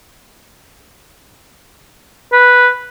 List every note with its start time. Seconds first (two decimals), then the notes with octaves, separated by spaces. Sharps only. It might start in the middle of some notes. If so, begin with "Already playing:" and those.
2.33 B4